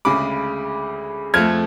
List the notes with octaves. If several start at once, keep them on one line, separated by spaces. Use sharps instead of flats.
D2 C#3 G#3 B5 D6
F2 F3 A3 F6 G#6